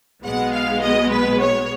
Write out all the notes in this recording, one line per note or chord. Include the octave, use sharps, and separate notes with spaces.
B1 B2 G#3 B3 F#5
F5
D#5
B4
C#5